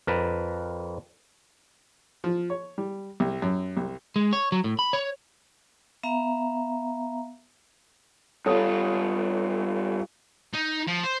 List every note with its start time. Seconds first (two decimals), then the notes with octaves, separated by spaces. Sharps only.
0.07 F2 A#4 B4 A5
2.24 F3
2.50 C#5
2.78 G3
3.20 C2
3.42 F#2
3.77 C2
4.16 G#3
4.33 C#5
4.52 F#3
4.64 A2
4.79 B5
4.93 C#5
6.03 B3 E5 F5 A#5
8.46 G2 F4 A4 C#5 D#6
10.54 D#4
10.88 F3
11.04 C5